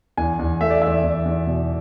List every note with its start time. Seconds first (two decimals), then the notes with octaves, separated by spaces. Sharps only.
0.17 E2 G#5
0.39 E2
0.61 A3 E5
0.70 D5
0.82 E2 E5
1.04 E2
1.25 E2
1.47 B2